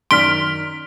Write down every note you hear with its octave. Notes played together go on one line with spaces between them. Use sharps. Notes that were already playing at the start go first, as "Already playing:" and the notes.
F#2 D#3 D5 C6 F6 B6 D7